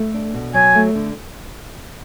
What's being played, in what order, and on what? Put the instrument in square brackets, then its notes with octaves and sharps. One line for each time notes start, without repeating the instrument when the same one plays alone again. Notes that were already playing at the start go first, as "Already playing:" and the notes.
Already playing: [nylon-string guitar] A3
D4
B2
[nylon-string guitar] F#3 [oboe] G#5
[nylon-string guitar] A3
D3